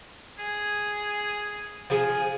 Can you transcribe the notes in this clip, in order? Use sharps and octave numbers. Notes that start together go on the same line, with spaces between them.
G#4
F3 G#4